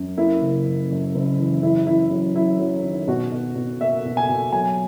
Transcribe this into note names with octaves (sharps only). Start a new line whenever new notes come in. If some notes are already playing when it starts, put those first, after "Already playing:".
Already playing: F#2
A#3 E4
F#1
F#2
F#2
F#1
E3
F#2 E4
F#2 E4
F#3
F#3 E4
F#3
D#3
B2 F#4
B2
B2
A#3 E5
B2
G#5
B2
F#3 G#5